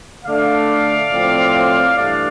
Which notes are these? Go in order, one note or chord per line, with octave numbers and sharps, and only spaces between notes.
D3 A3 D4 D5 F5
A2 F3 C4
G2 E3 A3 D4 D5 F5